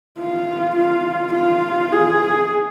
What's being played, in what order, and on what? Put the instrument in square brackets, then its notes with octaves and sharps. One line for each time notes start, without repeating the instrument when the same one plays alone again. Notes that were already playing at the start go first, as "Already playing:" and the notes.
[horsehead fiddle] F4
F4
F4
G#4